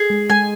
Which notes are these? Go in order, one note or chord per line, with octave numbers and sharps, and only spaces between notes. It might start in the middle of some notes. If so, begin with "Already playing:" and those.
Already playing: G#4
G#3
G#3 G#5